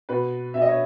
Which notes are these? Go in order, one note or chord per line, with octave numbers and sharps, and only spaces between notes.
B2 B4
B2 E5
D#5
C#5